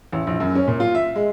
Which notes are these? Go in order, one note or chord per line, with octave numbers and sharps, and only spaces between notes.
A1
A#1
F#2
C#4
A#2
F4
E5
G#3